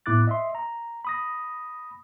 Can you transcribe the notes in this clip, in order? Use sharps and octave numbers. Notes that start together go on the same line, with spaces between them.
A2 B3 E4 D6 F#6 A6
D#5 E5 C6
A#5
B5 D#6 A#6